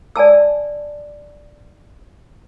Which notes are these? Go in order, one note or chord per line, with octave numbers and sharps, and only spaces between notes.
D5 G#5 A5 E6